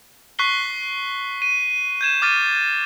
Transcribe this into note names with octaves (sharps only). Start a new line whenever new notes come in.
C#6 F#6 B6 C7 G7
D#7
G6 G#6 E7
D6 F6 A6 D#7